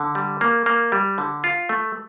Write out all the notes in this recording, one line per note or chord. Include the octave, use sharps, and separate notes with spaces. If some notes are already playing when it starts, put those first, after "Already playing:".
Already playing: D3
G3
A#3
A#3
G3
D3
F4
A3